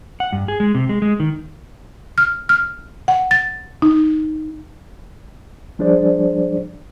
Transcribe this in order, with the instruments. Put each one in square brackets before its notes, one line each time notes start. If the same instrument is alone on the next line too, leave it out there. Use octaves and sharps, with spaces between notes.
[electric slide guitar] F#5
G2
G#4
G#3
C3
G#3
G#3
D#3
[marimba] F6
F6
F#5
A6
D#4
[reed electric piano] F3 G3 D4 G#4 C5 D5